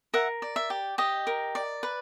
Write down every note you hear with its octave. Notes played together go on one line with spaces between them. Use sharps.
A#4 E5 F#5
D5
E5
G4
G4 D#5
A#4
D5
B4